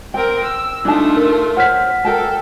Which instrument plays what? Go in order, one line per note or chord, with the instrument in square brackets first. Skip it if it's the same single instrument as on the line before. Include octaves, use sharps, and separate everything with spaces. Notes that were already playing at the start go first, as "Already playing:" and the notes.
[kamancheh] C4 A#4 [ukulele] G5
[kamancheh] E6
[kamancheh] A3 F4 [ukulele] D4 D#4 A5
[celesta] A#4
[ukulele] C5 C#5 [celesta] F#5 F6 B6
[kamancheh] A4 [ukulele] A#4 G5 A5